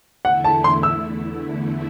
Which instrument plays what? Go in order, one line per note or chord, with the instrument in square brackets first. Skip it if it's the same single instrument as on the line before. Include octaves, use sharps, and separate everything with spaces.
[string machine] E2 D3 A3 E4 [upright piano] F#5
[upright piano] A5
C6
E6